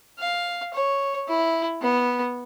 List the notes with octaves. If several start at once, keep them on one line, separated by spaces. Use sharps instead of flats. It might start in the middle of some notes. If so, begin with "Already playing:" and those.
F5
C#5
E4
B3